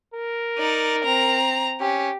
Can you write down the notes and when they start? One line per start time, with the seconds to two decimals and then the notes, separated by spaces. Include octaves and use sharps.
0.14 A#4
0.58 D#4 D5
1.04 C4 A#5
1.81 C#4 G4